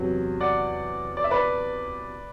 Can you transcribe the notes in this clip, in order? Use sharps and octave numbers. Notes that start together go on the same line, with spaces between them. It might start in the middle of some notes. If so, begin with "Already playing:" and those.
Already playing: E2 C3 F#3
D5 F#5
D5
E5
B4 D5